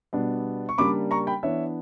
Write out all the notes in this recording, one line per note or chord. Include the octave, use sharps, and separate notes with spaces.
B2 G3 B3 D4
C#6
C#3 G3 A#3 D4 B5 D6
A#5 C#6
G5 B5
E3 B3 D4 C#5 E5